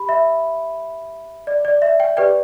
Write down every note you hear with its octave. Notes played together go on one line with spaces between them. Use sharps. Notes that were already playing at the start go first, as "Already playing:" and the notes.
Already playing: G4 B5
E5
D5
D5
E5
G5
G4 B4 D5 G5